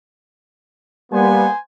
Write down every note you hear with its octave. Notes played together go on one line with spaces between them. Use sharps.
G3 A#3 B3 C5 G#5